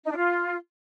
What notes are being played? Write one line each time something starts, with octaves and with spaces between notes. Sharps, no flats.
D#4
D4
F4